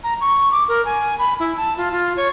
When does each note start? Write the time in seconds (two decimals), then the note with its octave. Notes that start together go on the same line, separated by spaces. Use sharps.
0.04 A#5
0.21 C#6
0.52 D6
0.69 A#4
0.85 G#5
1.19 B5
1.40 E4
1.57 A5
1.77 F4
1.92 F4
2.17 C#5